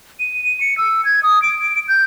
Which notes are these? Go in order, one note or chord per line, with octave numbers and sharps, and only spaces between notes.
D#7
C#7
E6
G#6
D#6
D7
G6